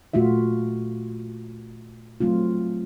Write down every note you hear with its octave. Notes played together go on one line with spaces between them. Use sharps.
A#2 A3 F4 F#4 E5
F#3 A3 C4 F4